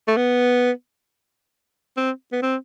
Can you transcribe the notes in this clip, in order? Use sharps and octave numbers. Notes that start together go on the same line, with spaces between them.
A3
B3
C4
B3
C4